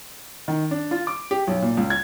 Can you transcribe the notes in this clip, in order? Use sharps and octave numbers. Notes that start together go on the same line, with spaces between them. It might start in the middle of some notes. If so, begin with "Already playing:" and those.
D#3
D4
F4
D6
G4
B1
A#2
C#2
G#6